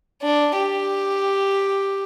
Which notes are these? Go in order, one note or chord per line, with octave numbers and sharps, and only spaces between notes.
D4
G4